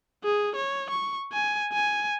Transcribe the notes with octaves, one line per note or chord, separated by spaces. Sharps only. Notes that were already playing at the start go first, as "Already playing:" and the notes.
G#4
C#5
C#6
G#5
G#5